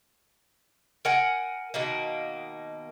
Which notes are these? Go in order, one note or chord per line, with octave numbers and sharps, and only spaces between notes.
A#4 F#5 G#5
B2 D#3 A#3